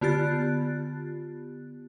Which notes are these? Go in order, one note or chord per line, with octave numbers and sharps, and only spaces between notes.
D3 B3 F4 G4 F#6 A6